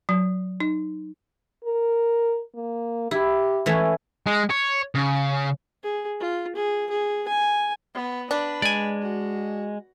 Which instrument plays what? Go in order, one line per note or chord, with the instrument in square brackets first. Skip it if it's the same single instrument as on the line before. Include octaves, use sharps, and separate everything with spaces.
[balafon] F#3
D#4
[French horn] A#4
A#3
[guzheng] E4 [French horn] G4
[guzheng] E3 A3 C#4
[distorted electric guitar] G#3
C#5
C#3
[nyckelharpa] G#4
F4
G#4
G#4
G#5
[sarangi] B3
[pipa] D4 [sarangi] B4
[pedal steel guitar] G#3 [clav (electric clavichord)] D5 G#5
[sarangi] F#4